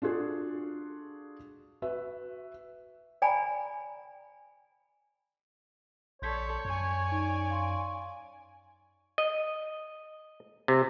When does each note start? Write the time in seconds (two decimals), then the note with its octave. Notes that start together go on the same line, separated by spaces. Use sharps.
0.02 D4 F4 F#4 G#4 A4
1.82 F#4 B4 E5
3.22 D5 G5 G#5 A#5 B5
6.22 A#1 A4 C#5 D5 C6 G6 B6
6.65 F#2 D5 G#5
7.12 D#4
7.51 F5 C6 C#6
9.18 D#5
10.68 C3